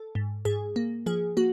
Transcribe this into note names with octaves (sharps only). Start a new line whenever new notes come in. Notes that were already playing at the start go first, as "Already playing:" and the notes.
Already playing: A4
G#2
G#2 G#4
A#3
F3 G#4
A#3 F#4